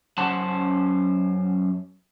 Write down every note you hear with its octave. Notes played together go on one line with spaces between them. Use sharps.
F#2 C#4 C5 F#5 A5